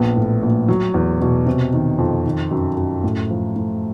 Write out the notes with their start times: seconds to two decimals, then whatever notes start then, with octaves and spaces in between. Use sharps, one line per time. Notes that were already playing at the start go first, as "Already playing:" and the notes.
Already playing: A#1 B3
0.16 A2
0.43 A#1
0.68 F#3
0.94 E2
1.21 B2
1.46 C3
1.73 D#3
1.99 F2
2.25 D#3
2.51 F#2
2.77 F#2
3.04 A2
3.30 F3
3.56 A2